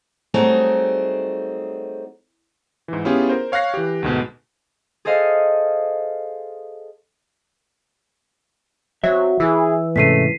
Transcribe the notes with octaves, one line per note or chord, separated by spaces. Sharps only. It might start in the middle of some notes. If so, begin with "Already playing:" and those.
F#3 G3 A3 C4 D#4 G#4
G#2 E3
B3 C#4 E4 F4 G4 G#4
A#4 C5
C#5 F5 C#6 F#6 A#6 C7
E3 G4
D2 G#2 B2
G#4 A4 C5 D#5 F5
F#3 C4 E5
E3 G#4 E6
G#2 C3 A3 C#4 B6 C7 D#7